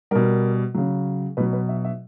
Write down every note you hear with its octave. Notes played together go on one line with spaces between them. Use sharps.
B2 G3 A#4
C#3 F#3
B2 F#3 B4
B4
E5
E5